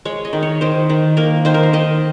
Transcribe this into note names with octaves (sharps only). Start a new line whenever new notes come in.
G#3 C#5
D#5
D#3
C#5
D#3 C5
D#3
A#3 A#4
D#3 C5
A#4
C5
D#3 D#5